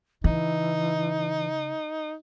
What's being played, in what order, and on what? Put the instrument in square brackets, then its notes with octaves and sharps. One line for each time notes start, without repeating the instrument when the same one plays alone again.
[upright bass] C#3 [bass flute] E3 [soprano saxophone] D#4